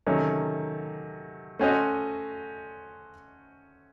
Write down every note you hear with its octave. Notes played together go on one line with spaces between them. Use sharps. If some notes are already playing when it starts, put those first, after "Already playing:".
C3 D#3 F#3 A3 C#4
A3 C#4 F#4 C5 D#5